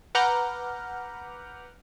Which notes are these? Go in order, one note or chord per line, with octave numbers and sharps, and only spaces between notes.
B4 F#5 A#5 D6 F6 G6